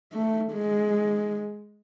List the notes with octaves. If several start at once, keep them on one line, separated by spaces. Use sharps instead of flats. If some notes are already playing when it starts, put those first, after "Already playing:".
A3
G#3